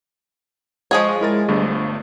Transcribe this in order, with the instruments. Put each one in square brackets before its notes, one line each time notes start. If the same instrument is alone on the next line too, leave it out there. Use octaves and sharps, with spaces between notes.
[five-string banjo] F3 G#4 C#5 [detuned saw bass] G#3 [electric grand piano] D#5 F5 F#5
[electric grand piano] E4 A#4 A6
G1 G2 A3